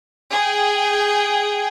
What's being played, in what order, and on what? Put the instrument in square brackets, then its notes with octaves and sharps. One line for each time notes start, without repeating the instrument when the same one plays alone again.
[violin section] G#4 G5